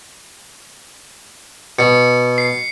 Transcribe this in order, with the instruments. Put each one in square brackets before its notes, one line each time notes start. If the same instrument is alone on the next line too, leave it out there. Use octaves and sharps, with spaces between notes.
[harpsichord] B2 [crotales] C#7
[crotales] C7